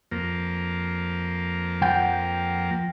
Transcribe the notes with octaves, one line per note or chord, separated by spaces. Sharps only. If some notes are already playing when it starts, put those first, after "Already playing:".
F2 A#3
F3 F#5 G5